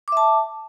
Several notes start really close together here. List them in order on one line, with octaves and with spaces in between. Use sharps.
D6 E5 A5